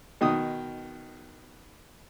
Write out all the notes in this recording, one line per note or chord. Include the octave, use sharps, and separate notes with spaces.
B2 D#3 D#6